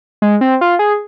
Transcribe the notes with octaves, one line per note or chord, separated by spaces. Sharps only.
G#3
C4
F4
G#4